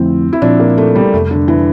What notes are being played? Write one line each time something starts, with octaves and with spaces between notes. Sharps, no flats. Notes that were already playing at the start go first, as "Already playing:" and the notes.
Already playing: F2 D3 F3 A3 C4 E4
E4
A#2 F3 C4 D4 F4
A#3
A3
G3
F2 C3 G3 A3
D3
E3